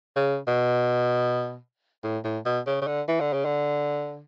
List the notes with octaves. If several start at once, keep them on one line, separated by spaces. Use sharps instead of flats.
C#3
B2
A2
A2
B2
C#3
C#3
D3
E3
D3
C#3
D3